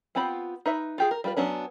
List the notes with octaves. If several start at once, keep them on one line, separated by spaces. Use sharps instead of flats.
B3 C4 F4 G4 B5
D#4 B4 E5
F4 G4 G#4
A#4
G3 F4 B4
F#3 B3 C#4 D4